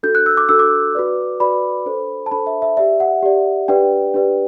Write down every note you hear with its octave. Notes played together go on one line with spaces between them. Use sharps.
D4 F#4 A4 G6
F#6
E6
D6
D4 F#4 A4 E6
D6
F#4 B4 D5
F#4 B4 D5 B5
D4 A4 C5
A5
D4 A4 C5 B5
E5
E5
G4 D5 E5
F#5
G4 D5
D4 G4 B4 D5 G5
D4 G4 B4 D5